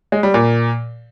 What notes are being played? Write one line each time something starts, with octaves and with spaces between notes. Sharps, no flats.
G#3
G3
A#2